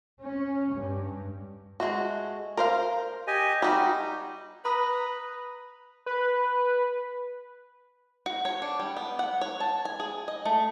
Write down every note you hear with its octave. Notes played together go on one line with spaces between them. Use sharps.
C#4
G2
G#3 A3 F#4
A#4 C5 F5
G4 D#5 G#5
G3 D#4 F#4
B4 A#5 B5 D#6
B4
F#4
C#5
D4
G3
B3
F#5
C#5
A5
G#5
G#4
D#5
A3